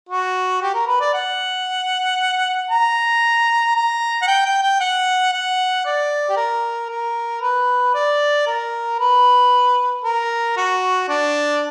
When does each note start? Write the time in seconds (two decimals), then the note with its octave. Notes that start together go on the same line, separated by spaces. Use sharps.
0.09 F#4
0.61 G4
0.74 A#4
0.87 B4
1.00 D5
1.13 F#5
2.71 A#5
3.75 A#5
4.22 F#5
4.27 G5
4.45 G5
4.62 G5
4.80 F#5
5.32 F#5
5.85 D5
6.30 G4
6.37 A#4
6.89 A#4
7.41 B4
7.94 D5
8.46 A#4
9.00 B4
10.04 A#4
10.57 F#4
11.08 D4